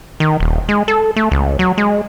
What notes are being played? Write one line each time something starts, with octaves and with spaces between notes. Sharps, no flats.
D#3
D#1
G#3
A4
A3
C#2
F#3
G#3